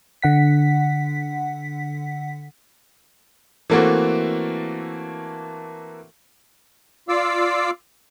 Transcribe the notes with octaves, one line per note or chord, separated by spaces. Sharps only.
D3 F#5 B6
E3 A3 A#3 C4 F#4 A4
F4 D5 F5 D6 E6